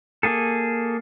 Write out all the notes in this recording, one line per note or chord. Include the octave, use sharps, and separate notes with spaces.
A#3 G#4 A4